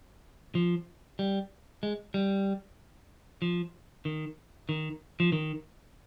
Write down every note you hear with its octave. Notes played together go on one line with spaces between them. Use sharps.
F3
G3
G#3
G3
F3
D#3
D#3
F3
D#3